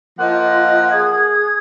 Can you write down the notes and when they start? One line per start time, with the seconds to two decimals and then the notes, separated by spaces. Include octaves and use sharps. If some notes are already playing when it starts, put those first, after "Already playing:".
0.19 F3 A#3 F4 D#5 F#5
0.91 G#4 D#6 G#6